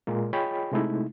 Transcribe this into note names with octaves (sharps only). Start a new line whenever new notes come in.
A#2 G#3 A#3
F4 G#4 C#5 D#5 G5 B5
C3 G#3 A3 D#4 E4